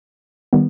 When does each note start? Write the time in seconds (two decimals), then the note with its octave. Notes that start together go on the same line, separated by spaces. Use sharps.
0.53 D#3 G3 B3